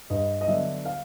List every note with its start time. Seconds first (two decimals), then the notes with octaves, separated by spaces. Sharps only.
0.10 G2 D#5
0.41 D#5
0.47 D3 F#3 B3 D4 E5
0.85 F5